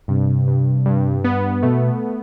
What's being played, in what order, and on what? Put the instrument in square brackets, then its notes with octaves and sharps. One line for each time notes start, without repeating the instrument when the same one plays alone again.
[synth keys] G2 [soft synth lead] C3
[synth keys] G2
G2
B3
[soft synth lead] B2 [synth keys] A3